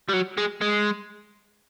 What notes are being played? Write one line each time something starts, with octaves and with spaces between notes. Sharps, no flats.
G3
F#3
G#3
G#3